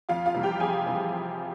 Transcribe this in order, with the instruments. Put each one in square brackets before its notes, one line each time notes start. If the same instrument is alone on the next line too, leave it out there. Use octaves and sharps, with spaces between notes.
[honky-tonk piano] F2 F4 F5
F4 F5
C3 E3 G3
G4 G5
F2 G#4 G#5
C3 E3 G3